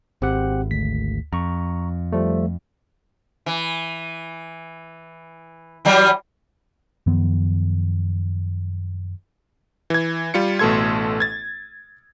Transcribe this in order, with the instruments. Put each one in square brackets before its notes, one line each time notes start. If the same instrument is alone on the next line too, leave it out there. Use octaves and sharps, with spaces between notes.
[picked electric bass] G#1 [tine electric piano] C4 G4 F#5
[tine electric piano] D2 B6
[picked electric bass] F2 [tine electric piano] A#5 C#6
[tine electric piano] F3 G3 A3
[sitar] E3
E3 F#3 G3
[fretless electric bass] F#2 D#3 F3 B3
[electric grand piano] E3 G#6
G3 F4 C#7
A1 B2 A3 A4 C6 G#6
G#6 A6